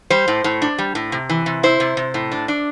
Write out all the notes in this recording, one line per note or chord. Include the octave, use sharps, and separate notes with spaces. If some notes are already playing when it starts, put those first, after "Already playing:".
G3 C5
A2
A2
D4
G3
A2
C3
E3
C3
E4 C5
C3
C3
A2
D4
D4